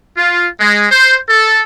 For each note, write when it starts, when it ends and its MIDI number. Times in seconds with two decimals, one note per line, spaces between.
0.17 0.47 65
0.60 0.86 56
0.91 1.17 72
1.29 1.63 69